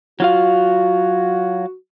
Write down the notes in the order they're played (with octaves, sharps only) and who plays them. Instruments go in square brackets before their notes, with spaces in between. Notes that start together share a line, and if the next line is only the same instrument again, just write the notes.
[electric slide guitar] F#3 F4 F5 [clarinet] F#4